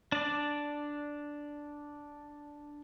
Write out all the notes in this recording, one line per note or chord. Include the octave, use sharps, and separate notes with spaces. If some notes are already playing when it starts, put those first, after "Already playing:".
D4 D5